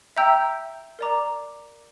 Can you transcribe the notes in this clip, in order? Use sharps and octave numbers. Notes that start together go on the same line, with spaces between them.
E5 G5 A#5 E6 G6
A#4 D5 A#5 D6